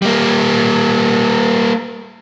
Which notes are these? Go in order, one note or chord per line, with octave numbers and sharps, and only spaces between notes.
G3 A#3